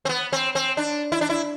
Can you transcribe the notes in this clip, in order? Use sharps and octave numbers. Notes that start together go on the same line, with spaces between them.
C4
B3
C4
C4
D4
E4
D4
E4